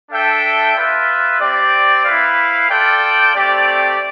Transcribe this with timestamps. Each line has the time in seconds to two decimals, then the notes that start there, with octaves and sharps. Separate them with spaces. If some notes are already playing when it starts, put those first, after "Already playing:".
0.10 D4 A4 E5 G5
0.75 F4 B4 E5
1.39 C4 G4 D5
2.04 E4 B4 F5
2.69 F4 A4 D5 G5
3.33 A3 C4 G4 D5